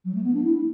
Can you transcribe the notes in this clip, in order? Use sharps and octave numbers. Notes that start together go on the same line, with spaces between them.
F#3
A3
B3
D4
E4